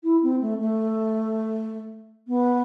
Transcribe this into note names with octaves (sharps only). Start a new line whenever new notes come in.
E4
C4
A3
A3
B3